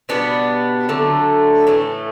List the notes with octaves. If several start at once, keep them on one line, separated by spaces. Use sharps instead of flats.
B2 G3 B3 D4
D3 F#3 A3
A2 E3 A3